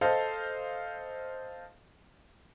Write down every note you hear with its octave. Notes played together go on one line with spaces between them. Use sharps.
A4 C5 D#5 F5